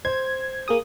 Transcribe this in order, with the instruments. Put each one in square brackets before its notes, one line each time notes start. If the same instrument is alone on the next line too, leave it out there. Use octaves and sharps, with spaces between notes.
[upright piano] C5 [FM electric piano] G#6
[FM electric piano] A#3 G#4 D#6